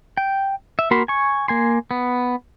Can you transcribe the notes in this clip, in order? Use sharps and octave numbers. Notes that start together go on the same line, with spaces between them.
G5
E5
A#3 F#4 A#4 B5 C6
G#5 C#6
A#3 G#5 C6
B3